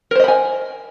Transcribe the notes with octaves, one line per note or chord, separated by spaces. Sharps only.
A#4 C5 D#5 G#5 B5